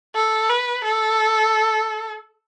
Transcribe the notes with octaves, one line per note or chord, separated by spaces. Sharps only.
A4
B4
A4